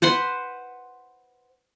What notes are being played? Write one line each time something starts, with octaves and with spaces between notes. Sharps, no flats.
B4 C5 F#5 C6